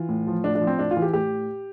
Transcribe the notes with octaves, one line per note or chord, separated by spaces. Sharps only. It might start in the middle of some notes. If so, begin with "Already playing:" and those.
Already playing: E3 F4
A2
F3
A2 D4
D4
F3
C4
A2 D4
F4
E3
G4
A2 G4